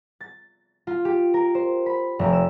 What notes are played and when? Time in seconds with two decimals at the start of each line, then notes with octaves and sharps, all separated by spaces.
0.21 A6
0.87 F4
1.05 G4
1.34 A#4
1.55 C5
1.86 B5
2.19 F1
2.33 E6